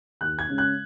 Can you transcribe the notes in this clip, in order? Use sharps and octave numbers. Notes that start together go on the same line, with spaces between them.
D#2 F#6
G#6
C#3 G#3 C#4
F#6